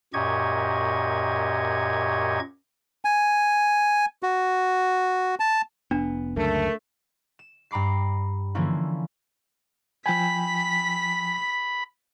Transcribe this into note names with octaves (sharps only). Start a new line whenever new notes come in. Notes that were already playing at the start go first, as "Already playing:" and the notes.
F#2 A#2 G4 D#5 C#6 G#6
G#5
F#4
A5
F1 B3 D4
C#2 F#2 D3 A3 A#4
E7
G2 A#5 B5 D6 C7
D3 E3 F3 A#3 C#4 E4
F3 G5 G#5 B5 B6